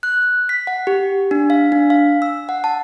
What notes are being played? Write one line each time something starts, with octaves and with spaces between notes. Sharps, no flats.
F#6
B6
F#5
G4
D4
F5
D4
F5
E6
F#5
A5